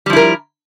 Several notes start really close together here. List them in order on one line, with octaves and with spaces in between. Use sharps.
G3 F3 E4 A#4